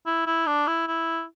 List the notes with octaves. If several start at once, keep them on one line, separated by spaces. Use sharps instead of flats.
E4
E4
D4
E4
E4